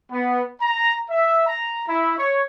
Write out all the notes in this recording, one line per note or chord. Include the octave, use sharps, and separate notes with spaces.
B3
A#5
E5
A#5
E4
C#5